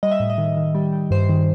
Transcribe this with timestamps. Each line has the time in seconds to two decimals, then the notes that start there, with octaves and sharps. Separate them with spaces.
0.03 G3 D#5
0.11 E5
0.20 A2
0.30 D#5
0.38 D#3
0.57 D#3
0.75 G3
0.93 G3
1.11 G2 C5
1.29 D#3